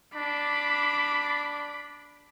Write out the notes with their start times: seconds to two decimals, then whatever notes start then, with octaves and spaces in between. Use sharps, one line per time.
0.15 D4 B5 D6